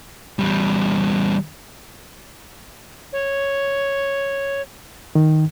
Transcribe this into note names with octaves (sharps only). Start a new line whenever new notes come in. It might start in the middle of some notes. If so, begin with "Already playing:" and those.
E2 G3
C#5
D#3